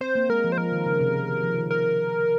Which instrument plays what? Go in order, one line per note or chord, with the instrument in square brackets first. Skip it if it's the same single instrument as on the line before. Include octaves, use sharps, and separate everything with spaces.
[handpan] C4 [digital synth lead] C5
[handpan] A#3
[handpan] G#3 [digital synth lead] A#4
[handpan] F3
[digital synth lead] C5
[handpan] F3 [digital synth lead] A#4
[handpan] D#3
C#3
C3
C3
D#3
F3
D#3
[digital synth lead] A#4